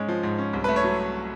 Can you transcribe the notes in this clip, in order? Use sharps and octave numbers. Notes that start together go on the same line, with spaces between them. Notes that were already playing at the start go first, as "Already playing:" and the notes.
Already playing: G#2 G#3 C#4
F3
G#2
C#4
C2
A3 B4
C#5
F#3